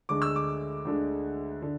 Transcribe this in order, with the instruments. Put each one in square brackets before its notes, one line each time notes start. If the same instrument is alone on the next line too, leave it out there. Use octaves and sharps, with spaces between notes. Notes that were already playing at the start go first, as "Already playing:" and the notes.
[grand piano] D2 D3 G#3 D6
E6
D6
D2 D3 G#3
D3